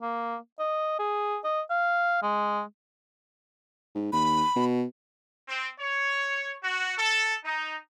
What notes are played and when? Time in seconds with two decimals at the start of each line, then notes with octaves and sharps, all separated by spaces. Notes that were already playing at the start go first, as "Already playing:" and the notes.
0.02 A#3
0.59 D#5
0.99 G#4
1.44 D#5
1.70 F5
2.23 G#3
3.95 G#2
4.13 D#2 B5
4.56 B2
5.48 C4
5.79 C#5
6.62 F#4
6.97 A4
7.44 D#4